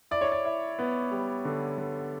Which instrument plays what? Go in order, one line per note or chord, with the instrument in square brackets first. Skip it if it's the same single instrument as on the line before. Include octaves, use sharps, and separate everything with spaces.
[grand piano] E4 [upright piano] D5
[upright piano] C#5
D5
[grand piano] E4
B3
G3
D3
D3